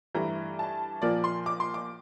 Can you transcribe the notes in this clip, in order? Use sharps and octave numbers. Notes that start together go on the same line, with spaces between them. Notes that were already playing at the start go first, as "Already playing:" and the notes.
G2 E3 A3 A#5
A5
A#2 F3 A#3 D5
C6
D6
C6
D6